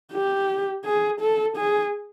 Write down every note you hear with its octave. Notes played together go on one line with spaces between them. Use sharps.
G4
G#4
A4
G#4